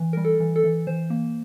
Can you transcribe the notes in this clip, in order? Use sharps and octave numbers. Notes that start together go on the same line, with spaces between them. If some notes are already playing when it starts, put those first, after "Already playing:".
Already playing: E3
G3 A#4
A4
E3
A4
E3
E3 C5
A#3